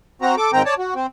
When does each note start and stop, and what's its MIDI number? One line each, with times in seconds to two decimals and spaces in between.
0.22 0.35 60
0.22 0.35 66
0.22 0.35 82
0.37 0.51 69
0.37 0.51 86
0.53 0.62 44
0.53 0.62 51
0.53 0.62 60
0.53 0.62 79
0.53 0.62 82
0.66 0.75 73
0.66 0.75 74
0.66 0.75 81
0.78 0.94 66
0.95 1.06 60